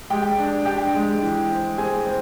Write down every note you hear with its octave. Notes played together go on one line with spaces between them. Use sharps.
G#3 G4 G5
D4
D4 G4 G5
G#3
E3
C4
C4 G#4 G#5
C4